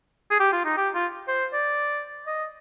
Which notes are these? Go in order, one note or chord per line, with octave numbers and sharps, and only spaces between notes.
G#4
G4
F4
D#4
G4
F4
C5
D5
D#5